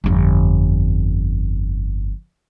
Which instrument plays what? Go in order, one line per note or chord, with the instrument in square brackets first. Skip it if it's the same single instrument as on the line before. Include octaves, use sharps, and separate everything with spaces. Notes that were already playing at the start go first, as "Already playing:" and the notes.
[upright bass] G1 F2